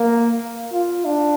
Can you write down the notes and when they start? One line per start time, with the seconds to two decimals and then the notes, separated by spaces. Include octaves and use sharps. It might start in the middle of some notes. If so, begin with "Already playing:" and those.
Already playing: A#3
0.73 F4
1.05 D4